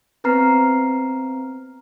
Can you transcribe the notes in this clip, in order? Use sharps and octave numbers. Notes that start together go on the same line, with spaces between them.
B3 C4 B4 A#5 F6 C7